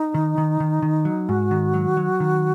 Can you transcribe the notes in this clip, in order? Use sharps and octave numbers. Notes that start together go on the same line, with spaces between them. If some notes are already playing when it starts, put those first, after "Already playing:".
Already playing: D#4
D#3
D#3
D#3
D#3
F#3
G#2 F#4
D#3
F#3
F#3
D#3